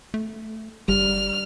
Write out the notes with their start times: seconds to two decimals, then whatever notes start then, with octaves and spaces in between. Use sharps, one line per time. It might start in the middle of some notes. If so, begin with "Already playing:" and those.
0.14 A3
0.88 G1 G3 F6